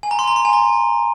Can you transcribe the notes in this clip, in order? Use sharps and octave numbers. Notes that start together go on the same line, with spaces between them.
G#5
A#5
C6
A#5
C6
G#5
A#5